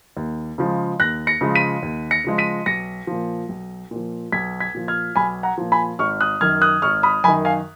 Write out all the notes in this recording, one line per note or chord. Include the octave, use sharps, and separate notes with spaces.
D#2
C#3 F3 G#3
D#2 F#6 A#6
A#6 C#7
C#3 F3 G#3
B6 D#7
D#2
A#6 C#7
C#3 F3 G#3
B6 D#7
B1 A#6 C#7
A#2 F3
B1
A#2 F3
B1 G#6 B6
G#6 B6
A#2 F3
F6 G#6
B1 G#5 B5
F#5 A#5
A#2 F3
G#5 B5
G#1 C#6 F6
D#6 F#6
F#2 D#3 F6 G#6
D#6 F#6
G#1 C#6 F6
B5 D#6
F#2 D#3 G#5 B5
F5 G#5